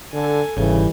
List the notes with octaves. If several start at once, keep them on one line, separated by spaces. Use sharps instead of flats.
D3 A4 G#5
G1 G#2 C#3 E3 G3